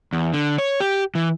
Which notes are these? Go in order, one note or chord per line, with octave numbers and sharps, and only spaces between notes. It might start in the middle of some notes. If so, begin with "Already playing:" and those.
E2
D3
C#5
G4
E3